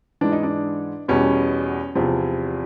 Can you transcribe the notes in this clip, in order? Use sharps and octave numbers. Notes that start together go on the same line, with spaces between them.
G#2 E3 G#3 D4
D#4
D4
E2 B2 G3 C#4
E2 C3 F3 C4